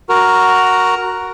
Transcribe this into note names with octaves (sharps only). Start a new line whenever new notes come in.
F#4 A#4